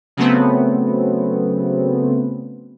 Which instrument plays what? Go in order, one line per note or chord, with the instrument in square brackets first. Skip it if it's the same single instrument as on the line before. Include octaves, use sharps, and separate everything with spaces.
[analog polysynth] C#3 F#3 A3 B3 C4